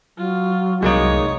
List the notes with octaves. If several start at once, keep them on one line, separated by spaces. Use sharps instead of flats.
F#3 F4
C2 F2 G#3 A#3 D#4 C#5 D#6